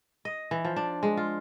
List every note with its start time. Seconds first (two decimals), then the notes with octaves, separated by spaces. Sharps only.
0.25 D#5
0.51 E3
0.64 F3
0.76 D4
1.03 G#3
1.17 F4